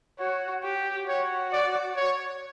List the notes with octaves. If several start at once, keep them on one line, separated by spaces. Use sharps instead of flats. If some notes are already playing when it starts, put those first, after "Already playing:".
F#4 C#5
G4
F#4 C#5
D5
C#5